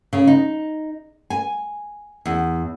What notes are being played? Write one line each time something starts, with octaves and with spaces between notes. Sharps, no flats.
C#3
D#4
G#5
E2